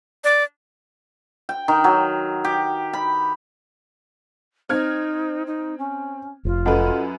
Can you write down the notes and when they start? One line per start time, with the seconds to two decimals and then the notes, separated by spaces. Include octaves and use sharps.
0.24 D5
1.49 G5
1.68 D#3
1.84 F#3
2.45 G4
2.93 B5
4.69 C4 D#4 F6 G#6
5.46 D#4
5.78 C#4
6.45 F1 F4
6.66 F#2 A4 B4 D#5 F#5